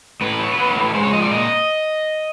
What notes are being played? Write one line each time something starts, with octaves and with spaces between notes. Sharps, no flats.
A2 B4
F#3
F#3
A2
G#3 C5
C#5
F3 D#5
D5
A#2 D#5